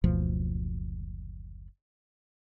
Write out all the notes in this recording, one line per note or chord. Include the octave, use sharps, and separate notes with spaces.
F#1 D2 B2 F3